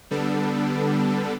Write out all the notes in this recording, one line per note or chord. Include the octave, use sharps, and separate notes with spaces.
D3 G3 B3 D4 A4